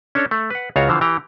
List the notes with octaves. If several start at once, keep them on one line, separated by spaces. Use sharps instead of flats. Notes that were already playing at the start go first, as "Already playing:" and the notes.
C#4 D4 A4 C#5
A3
B4 F#5
C#2 C#3 F4 F#4 C#5 A#5
D3 E3 F3 C5 F5
E3 G4 G5 A#5